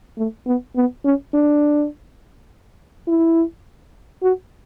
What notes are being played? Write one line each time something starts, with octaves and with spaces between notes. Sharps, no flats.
A3
B3
B3
C#4
D4
E4
F#4